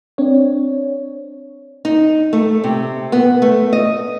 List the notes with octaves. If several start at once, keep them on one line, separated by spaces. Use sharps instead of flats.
C4 D4 C#5
D#4
A3
C3
B3
A3
D#5